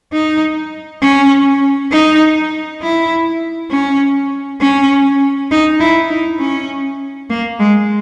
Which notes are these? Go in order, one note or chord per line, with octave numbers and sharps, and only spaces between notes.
D#4
C#4
D#4
E4
C#4
C#4
D#4
E4
D#4
C#4
A#3
G#3